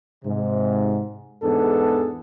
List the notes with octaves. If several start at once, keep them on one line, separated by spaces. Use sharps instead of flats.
G#2 C3
E2 G#2 B3 D4 G#4 A4